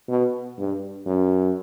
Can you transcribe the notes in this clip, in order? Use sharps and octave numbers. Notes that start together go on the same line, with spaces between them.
B2
G2
F#2